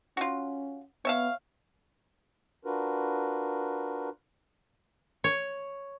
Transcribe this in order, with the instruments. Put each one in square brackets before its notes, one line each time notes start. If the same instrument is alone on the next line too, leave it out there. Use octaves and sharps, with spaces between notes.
[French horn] C#4 [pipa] F4 F#4
[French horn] B3 [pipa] C#5 E5 F5
[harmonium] D4 F4 F#4 A#4 B4
[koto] C#5